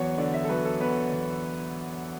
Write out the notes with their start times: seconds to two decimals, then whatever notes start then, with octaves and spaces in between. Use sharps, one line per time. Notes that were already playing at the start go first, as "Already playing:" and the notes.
Already playing: E2 F#3 B3 C#5
0.18 D3 D5
0.34 E5
0.44 A4
0.49 F#3 B4
0.65 A4
0.80 B3 B4
1.12 E2